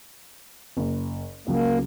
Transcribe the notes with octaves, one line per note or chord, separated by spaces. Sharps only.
F#1
C#2 C#3 F#3 A#3